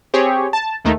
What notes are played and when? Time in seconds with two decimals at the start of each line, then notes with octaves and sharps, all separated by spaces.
0.14 C4 G4 G#4 C#5
0.53 A5
0.85 D#2 D#3 A3 D#4